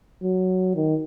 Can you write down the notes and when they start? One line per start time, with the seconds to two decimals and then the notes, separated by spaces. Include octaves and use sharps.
0.23 F#3
0.75 D#3